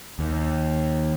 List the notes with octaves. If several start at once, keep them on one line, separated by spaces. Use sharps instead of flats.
D#2